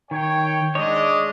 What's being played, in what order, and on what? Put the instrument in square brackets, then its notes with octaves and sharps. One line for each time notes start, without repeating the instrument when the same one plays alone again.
[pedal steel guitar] D#3 [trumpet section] C#5 G5
[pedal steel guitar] G#3 C#5 [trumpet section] D4 D#5